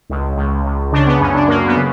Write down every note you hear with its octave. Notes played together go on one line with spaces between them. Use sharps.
C#2
C#2
C#2
C#3 D4
B3
F#2 C#4
D4
F#2 A#3
B3
C#3